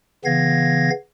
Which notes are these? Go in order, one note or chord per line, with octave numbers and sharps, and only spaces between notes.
C#3 E3 B3 F5 G#6 A#6